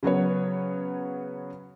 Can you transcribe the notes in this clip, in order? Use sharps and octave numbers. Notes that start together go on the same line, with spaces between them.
C#3 F#3 B3 C#5